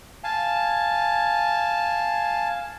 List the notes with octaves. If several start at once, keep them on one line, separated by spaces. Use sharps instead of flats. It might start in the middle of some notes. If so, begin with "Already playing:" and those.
F5 G#5 A5